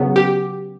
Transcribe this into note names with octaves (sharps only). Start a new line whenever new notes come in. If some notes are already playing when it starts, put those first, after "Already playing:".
Already playing: C#3 F#3 B3
G4